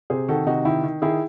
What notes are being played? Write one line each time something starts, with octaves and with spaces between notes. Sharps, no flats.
C3 G#4 C5
D#3 F#4 A4
C3 D#4 F#4
D#3 E4
D#3
D#3 E4 G#4